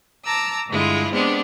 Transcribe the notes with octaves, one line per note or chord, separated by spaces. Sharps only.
A5 A#5 D6 E6
G2 D3 G#3 E4 F4
G#3 B3 C4 D4 G4